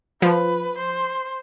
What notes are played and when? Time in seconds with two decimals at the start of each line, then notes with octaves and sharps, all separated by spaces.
0.22 F3 B4
0.79 C5